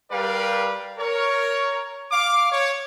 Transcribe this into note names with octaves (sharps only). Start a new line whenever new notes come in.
G3 G4 A#4 B4 D5 F5
A#4 C#5
F5 D6
C#5